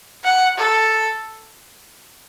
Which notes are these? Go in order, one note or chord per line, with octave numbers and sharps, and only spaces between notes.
F#5
A4